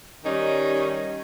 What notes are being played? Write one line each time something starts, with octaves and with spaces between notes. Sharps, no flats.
D#3 G3 C#4 D#4 G4